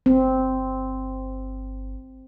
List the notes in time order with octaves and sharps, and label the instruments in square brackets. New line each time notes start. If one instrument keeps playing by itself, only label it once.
[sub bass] G1 [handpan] C4